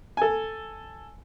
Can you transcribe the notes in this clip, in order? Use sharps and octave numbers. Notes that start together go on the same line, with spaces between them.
A4 G#5